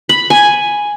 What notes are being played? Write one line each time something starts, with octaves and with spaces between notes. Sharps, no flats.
B5
G#5